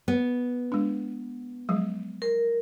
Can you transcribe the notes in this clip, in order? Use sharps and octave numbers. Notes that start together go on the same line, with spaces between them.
B3
G#3 D4
F3 F#3 G#3
A#4